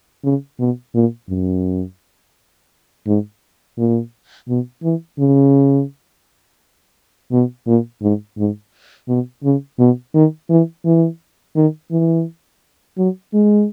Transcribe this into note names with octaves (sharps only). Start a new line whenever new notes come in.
C#3
B2
A#2
F#2
G#2
A#2
B2
E3
C#3
B2
A#2
G#2
G#2
B2
C#3
B2
D#3
E3
E3
D#3
E3
F#3
G#3